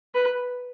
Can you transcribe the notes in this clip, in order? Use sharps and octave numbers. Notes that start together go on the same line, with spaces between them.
B4